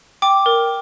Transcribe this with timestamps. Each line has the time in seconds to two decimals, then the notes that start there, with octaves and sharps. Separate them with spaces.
0.22 G5 D6
0.46 A#4